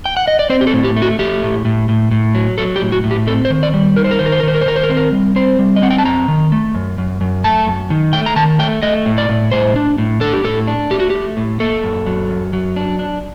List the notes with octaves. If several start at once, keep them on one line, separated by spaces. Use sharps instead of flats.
G5
F#5
D#5
D5
C4 C5
G4
A4
A2
G4
A3
F#4
A3 G4
A2
A2
A2
A2
F#3
F#3 A4
G4
A2
F#4
A2
G4
C4 A4
C5
D#3
D5
G3
D#4 A#4
C5
A#4
D#3 C5
A#4
C5
A#4
D#3 C5
A#4
C5
D#3 A#4
C5
A#4
C4 C5
A#4
G3
C4 C5
G3
D#5
C4 F#5
G5
A5
F#2 A#5
D#3
A3
F#2
F#2
F#2
A3 A5
F#2
D#3
A3 G5
A#5
D#3 A5
A3 G5
A3 D#5
A2
D5
A2
A2 C5
D4
A2
D4 A4
G4
A2 A4
D4
A3 G4
F#4
A3 G4
A2
A#3 A4
F#2
F#3
F#2
F#3
D4
D4